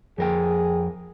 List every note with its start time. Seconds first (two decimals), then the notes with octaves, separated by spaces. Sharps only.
0.18 F2 G#4 A#4 G5